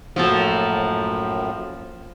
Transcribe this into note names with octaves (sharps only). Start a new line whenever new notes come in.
F#2 A2 F3 A#3 F#4 A4